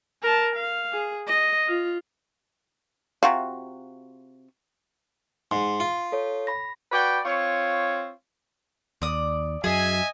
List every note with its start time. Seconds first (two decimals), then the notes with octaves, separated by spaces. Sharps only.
0.22 A#4 A5
0.56 F5
0.93 G#4
1.27 D#5
1.67 F4
3.23 C3 F4 F#4 F5
5.51 G#2 C6
5.80 F4
6.12 A4 C#5
6.47 B5 A#6
6.92 F#4 B4 D5 G5
7.25 C4 F4 C#5
9.02 D#2 D5 D#6
9.64 F#2 F#3 G#4 D#5 E5 G#5